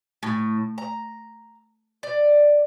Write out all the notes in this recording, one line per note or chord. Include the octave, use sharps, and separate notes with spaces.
A2
A#5
D5